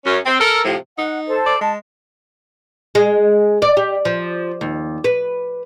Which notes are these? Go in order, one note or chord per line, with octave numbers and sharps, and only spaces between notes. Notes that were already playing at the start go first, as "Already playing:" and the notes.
F#2 C#4
C4
A4 A#4
A2 C3 F3
D#4 F#5
A4 C5 A5
D5
G#3 A5
G#3
D5
G4
F3
D#2
B4